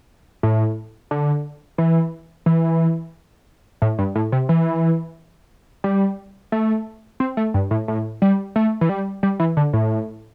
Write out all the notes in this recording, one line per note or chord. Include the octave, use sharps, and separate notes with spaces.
A2
D3
E3
E3
A2
G2
A2
C3
E3
G3
A3
C4
A3
G2
A2
A2
G3
A3
E3
G3
G3
E3
D3
A2